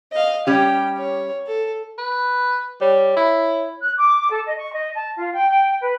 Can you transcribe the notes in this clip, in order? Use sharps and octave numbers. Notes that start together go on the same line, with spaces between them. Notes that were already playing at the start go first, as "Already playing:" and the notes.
D#5 F5
G3 C#4 G4 G5
C#5
A4
B4
G3 C#5
E4
F#6
D6
A4
D#5
C#6
D#5
A5
F4
G5
G5
B4